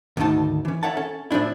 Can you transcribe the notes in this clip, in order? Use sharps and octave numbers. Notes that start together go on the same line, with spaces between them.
D2 G#2 D3 D#3 D#4 A5
E3 C#4
C#5 E5 F#5 A5
C#4 A4 A5
A2 F3 C4 D4 E4